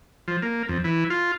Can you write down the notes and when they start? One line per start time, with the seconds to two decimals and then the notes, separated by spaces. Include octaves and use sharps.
0.28 F3
0.42 A#3
0.69 F2
0.84 E3
1.10 F4